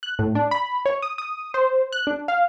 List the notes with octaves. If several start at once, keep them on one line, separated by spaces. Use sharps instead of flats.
F#6
A2
D4
B5
C#5
D#6
D#6
C5
F#6
D4
F5